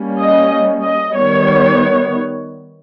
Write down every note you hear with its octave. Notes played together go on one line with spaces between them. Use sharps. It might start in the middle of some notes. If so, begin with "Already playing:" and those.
Already playing: G3 A#3 C#4
D#5
D#5
D#3 G3 B3 C#5